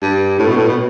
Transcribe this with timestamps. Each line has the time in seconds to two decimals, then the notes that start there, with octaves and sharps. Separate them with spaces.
0.02 G2
0.39 A2
0.47 B2
0.56 A2
0.67 B2